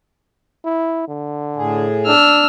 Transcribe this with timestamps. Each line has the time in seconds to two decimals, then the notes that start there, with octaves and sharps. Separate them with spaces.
0.65 E4
1.08 D3
1.56 A2 G#4
2.07 D4 E6 F6